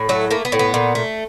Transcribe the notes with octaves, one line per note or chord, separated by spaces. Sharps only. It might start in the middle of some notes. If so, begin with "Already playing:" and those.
Already playing: A2
F#3 A3
A3 A#3
B3
A2
B3
A#2
A3